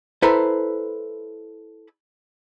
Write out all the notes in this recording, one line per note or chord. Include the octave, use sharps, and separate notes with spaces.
E4 A4 B4 C5 A#5